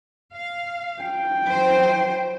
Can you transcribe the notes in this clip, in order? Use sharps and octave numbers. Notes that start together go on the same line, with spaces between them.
F5
G5
E3 F#3 C5